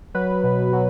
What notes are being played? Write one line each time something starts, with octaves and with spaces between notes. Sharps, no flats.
F#3 B4
B2
F#3